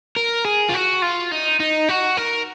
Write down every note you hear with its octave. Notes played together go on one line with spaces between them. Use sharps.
A#4
G#4
F4
F#4
F4
D#4
D#4
F#4
A#4